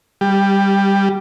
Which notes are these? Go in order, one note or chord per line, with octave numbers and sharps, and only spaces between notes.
G3